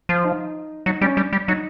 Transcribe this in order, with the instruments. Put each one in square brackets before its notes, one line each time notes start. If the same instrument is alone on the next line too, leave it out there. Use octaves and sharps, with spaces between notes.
[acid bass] F3
[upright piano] D#4
[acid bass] F#3 [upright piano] D#4
[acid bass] G3 [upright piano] C#4
[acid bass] G3 [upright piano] D4
[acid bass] G3
[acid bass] F#3 [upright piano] D#4